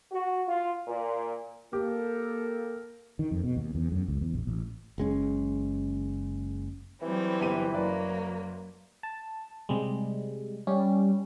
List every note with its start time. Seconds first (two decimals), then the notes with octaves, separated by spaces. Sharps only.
0.11 F#4
0.47 F4
0.86 A#2
1.73 A#3 G4 A4 A#4
3.19 D#3
3.31 F2
3.44 B2
3.56 D#2
3.75 E2
3.92 F#2
4.08 C#2
4.21 E2
4.34 A#1
4.47 A1
4.98 F#1 G#3 C#4
7.02 E3 F#3 G3 C4
7.41 G1 G4 D#7
7.74 F#1 F#3 A#3 B4 D5
9.03 A5
9.69 C3 G3 G#3
10.67 G3 C#4